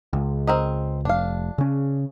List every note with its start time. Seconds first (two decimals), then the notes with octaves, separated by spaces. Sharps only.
0.13 C#2
0.47 C4 A#4 D#5
1.05 F1 D4 F5
1.58 C#3 C#4